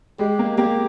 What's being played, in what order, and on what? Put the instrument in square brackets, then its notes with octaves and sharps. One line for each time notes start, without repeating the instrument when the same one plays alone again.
[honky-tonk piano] G#3 [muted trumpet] G4
[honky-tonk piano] A#3
[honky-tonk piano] A#3 [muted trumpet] G4